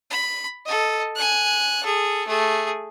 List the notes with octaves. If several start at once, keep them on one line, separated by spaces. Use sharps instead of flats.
B5
A4 D#5
G#5 F#6
G#4 A4
A3 G#4